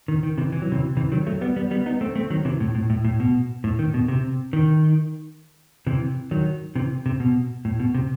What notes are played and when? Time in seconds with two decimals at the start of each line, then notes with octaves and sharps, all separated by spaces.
0.08 D#3
0.23 D#3
0.38 C3 E3
0.52 E3
0.62 F#3
0.72 C3 E3
0.97 C3 E3
1.12 D#3 F#3
1.27 F#3 A3
1.41 G3 B3
1.56 G3 B3
1.71 G3 B3
1.86 B3 D#4
2.01 A3 C4
2.16 A3 C4
2.30 D#3 F#3
2.45 C3 E3
2.60 A2
2.75 A2
2.90 A2
3.05 A2
3.20 B2
3.64 A2
3.79 D#3
3.94 B2
4.08 C3
4.53 D#3
5.87 C3 E3
6.31 D#3 F#3
6.76 C3 E3
7.06 C3
7.20 B2
7.65 A2
7.80 B2
7.95 C3